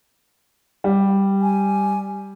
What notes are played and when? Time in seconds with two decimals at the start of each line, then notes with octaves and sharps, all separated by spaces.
0.84 G3
1.42 G#5